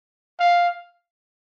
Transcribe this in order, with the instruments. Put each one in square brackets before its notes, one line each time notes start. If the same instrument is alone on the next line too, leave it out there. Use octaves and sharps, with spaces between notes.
[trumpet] F5